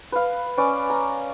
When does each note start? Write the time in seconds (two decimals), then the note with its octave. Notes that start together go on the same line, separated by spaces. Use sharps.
0.12 B4 F5
0.58 C#4 B4 D5
0.90 A#5